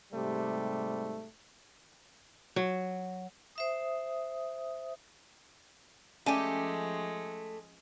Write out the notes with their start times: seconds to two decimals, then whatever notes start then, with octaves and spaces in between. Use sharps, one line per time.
0.13 G#2 C3 G3 A3
2.56 F#3
3.56 C5 E5 D#6
6.26 F3 G#3 A3 C#4 G4 D5 G#5